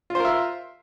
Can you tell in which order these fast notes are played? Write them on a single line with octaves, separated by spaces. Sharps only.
F4 C5 A#4 E5